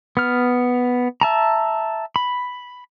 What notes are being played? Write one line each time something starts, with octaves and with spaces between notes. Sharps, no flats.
B3 F6
E5 A5 A#5
B5